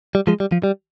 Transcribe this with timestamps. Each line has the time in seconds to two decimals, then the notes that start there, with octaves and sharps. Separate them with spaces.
0.15 G3
0.27 F3 G#3
0.40 G3
0.52 F3
0.64 G3